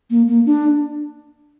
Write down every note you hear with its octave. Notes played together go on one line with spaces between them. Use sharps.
A#3
A#3
D4